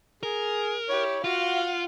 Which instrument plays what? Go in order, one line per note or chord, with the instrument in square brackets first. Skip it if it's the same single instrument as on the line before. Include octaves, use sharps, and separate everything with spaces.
[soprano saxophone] G#4 [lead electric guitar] A#4
[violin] E4 G4 [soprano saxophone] C#5
[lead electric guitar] F4 [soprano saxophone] F#4 [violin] F5 F#5